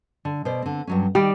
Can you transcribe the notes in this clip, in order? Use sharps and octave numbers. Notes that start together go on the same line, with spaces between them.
D3
B2 C5 D5
D3 C4
G2 F#3 C#4
D#3 G3 D5